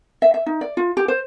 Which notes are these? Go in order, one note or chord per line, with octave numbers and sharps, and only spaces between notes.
E5
E5
D#4
D5
F4
G4
C5